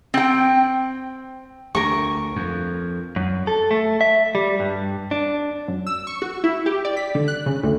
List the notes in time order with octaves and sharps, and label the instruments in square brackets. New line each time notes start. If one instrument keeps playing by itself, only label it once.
[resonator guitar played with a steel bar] C4 G5
[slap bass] D2 [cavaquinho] A#4 C#6
[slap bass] F2
[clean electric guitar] F#2
A4
A3
E5
G3
G2
D4
[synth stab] F#2
E6
C#6
F#4
E4
G4
D5
B6
D3
F#6
C#3
D2